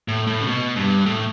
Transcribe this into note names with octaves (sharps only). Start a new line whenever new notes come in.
A2
A2
C#3
B2
G2
A2